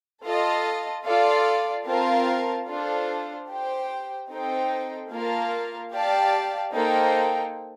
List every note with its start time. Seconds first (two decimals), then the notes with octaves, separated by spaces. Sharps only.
0.25 F4 A4 D#5 A5
1.05 F4 A4 D5 F5
1.87 C4 F4 A#4 F5 A5
2.69 D4 F4 A4 C5
3.50 G4 C5 G5
4.31 C4 D#4 A4 C5 G5
5.12 A#3 F4 A#4 F5 A5
5.92 G4 D5 F5 A5
6.74 A#3 D#4 A4 C5 G5